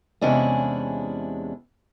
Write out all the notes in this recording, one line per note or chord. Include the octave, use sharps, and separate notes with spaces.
E2 C3 G#3 C#4 D4 E4